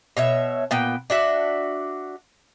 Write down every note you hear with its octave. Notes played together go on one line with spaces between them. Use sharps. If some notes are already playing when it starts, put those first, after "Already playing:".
B2 C#5 E5
A#2 B3 G5
D4 F#4 E5